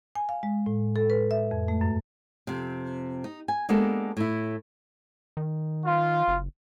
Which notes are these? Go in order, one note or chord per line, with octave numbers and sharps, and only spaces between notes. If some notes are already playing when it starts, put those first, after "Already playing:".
G#5
F5
G#3
A2
A4
B4
E5
F2
A3
F#2
F2 C3
D#4
G#5
G#3 A#3 B3 D4 G4 A4
A2 E4
D#3
F4
F#1